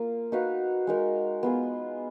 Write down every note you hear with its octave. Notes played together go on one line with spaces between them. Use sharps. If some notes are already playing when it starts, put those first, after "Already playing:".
Already playing: A#3 F4
D#4 F#4 B4 F5
G#3 D#4 A#4
B3 F4 G#4